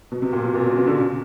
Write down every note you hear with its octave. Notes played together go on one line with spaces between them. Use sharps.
B2
C3
A#2
B2
A#2
B2
C#3
C3
D3
C#3